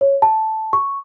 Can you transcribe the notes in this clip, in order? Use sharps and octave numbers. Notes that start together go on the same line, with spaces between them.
C#5
A5
C#6